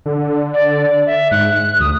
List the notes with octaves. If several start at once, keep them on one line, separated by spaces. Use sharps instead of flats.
D3
D5
E5
G#2 F#6
D2 D#6